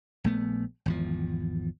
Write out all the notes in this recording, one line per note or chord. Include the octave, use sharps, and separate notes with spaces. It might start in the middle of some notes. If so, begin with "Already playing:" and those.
A#1 A3 B3
G#1 E2 F3